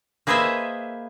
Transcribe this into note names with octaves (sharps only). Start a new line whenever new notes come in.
A#3 G#4 B4 C5 D#5 E5